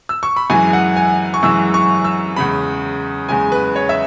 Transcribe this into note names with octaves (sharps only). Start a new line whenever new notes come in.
E6
C#6
B5
F#2 E3 G#3 G#5
F#5
G#5
C#6
F#2 E3 G#3 E6
C#6
E6
E2 C#3 G#3 B5
E2 C#3 G#3 G#5
B4
C#5
E5